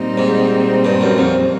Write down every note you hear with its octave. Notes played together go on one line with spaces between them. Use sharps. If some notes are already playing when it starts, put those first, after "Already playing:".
Already playing: A#2 G3 C4 D#4
G#2
G2
F#2
F2